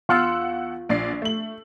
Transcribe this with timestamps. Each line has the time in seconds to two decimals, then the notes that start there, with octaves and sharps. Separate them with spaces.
0.09 E2 F4 F#5 E6
0.89 A#1 D5 C7
1.22 A3 F#7